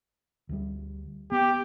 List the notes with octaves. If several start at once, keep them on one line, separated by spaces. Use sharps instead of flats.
D2 G3
B3 G4